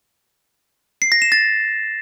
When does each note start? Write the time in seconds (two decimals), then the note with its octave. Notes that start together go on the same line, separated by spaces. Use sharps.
1.02 C7
1.12 A#6
1.22 E7
1.32 A6